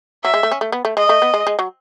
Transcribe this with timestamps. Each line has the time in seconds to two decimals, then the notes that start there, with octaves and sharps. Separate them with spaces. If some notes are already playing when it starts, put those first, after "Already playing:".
0.24 F#3 E5
0.34 G#3
0.43 A3
0.52 C#4
0.61 A3
0.72 B3
0.85 A3
0.97 G#3 D#5
1.09 A3
1.22 B3
1.34 G#3
1.47 G#3
1.59 F#3